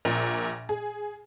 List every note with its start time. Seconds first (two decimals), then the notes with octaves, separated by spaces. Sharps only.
0.05 A#1 A#2
0.69 G#4